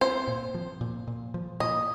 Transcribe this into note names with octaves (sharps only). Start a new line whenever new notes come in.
C4 C5
A#2
F3
A#2
A#2
F3
A#2 D#5